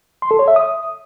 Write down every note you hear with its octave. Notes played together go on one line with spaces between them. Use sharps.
C6
A4
C#5
E5
D#6